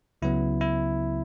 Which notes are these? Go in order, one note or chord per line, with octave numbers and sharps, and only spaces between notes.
C#2 C#3 F#3 B3 E4
E4